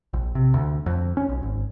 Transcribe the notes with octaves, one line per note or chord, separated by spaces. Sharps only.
A#1
C3
D2
F2
C#4
B1
G#1